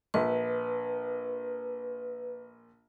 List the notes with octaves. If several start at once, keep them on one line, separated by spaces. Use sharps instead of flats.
A#1 B4